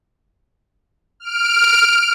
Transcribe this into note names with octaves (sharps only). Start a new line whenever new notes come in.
F6 D7